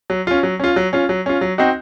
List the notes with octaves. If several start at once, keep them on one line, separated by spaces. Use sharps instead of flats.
F#3
C#4 F4
F#3
C#4 F4
F#3
C#4 F4
F#3
C#4 F4
F#3
C4 D#4 F#4